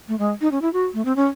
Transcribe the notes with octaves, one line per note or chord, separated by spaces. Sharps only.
A3
G#3
D#4
C#4
E4
F#4
A3
C4
C#4